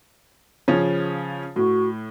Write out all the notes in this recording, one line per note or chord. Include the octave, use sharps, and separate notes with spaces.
C#3 F3 C#4
A2 F#4